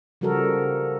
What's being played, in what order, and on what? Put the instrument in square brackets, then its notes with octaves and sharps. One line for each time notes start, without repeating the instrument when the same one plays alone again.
[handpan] C#3 F3 G3 F#4 A4 A#4